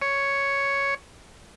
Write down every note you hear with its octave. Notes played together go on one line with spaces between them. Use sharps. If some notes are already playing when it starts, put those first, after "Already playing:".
C#5